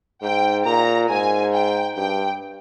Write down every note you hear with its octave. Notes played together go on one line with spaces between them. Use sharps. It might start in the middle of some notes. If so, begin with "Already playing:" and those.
G#2 G5
A#2 A#5
G#2 G#5
G5
G2 G5